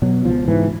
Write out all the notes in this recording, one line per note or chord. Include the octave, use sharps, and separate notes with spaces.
B2 F#3
C#2 F3
G#2 E3